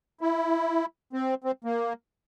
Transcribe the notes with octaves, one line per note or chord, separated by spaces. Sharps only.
E4
C4
C4
A#3